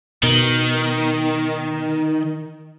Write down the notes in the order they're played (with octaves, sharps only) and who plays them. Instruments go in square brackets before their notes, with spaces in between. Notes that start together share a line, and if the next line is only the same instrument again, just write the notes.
[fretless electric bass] B2 [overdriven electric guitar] D#3